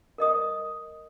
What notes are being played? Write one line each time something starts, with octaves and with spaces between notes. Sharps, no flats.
A#4 D#5 D#6